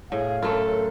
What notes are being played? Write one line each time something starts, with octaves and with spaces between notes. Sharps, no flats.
A2 G#4 F5
F#2 A3 F4 A4